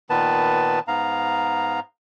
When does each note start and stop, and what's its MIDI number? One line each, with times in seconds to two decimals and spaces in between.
0.10 0.79 46
0.10 0.79 51
0.10 0.79 59
0.10 0.79 71
0.10 0.79 81
0.88 1.80 44
0.88 1.80 59
0.88 1.80 77
0.88 1.80 82